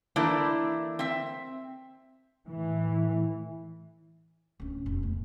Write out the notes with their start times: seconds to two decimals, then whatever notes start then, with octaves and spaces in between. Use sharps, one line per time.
0.16 E3 A3 A#3 D4 E4
0.99 C4 E5
2.48 A2 E3
4.60 D1 C#4
4.86 E1
5.03 C#2 A2